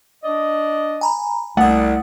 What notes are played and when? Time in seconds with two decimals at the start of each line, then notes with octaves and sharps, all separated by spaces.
0.24 D4 D5 D#5
1.01 G#5 A#5 B5
1.57 C2 A3 F#5 D#6